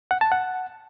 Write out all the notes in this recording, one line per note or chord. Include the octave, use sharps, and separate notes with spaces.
F#5
A5
F#5